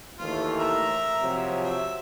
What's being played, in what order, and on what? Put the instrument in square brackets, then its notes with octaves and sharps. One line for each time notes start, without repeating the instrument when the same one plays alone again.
[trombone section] D#2 E3 A3 [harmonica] F4
[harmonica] A#4 E5 A#5
[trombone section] C3 F3 F#3
[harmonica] E5